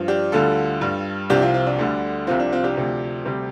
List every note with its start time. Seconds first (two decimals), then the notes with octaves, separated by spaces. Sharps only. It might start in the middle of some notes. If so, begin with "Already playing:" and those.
Already playing: G2 F3
0.08 D4 G4
0.32 D2 D3 G3 F4 A4
0.81 G2 G3
1.30 C2 C3 F3 D4 G4
1.42 C4 F4
1.54 C4 F4
1.66 D4
1.79 D2 D3 G3
2.27 C2 C3 F3 C4 F4
2.40 D4
2.52 C4 F4
2.63 D4 G4
2.76 D2 C3 F3
3.25 D2 C3 G3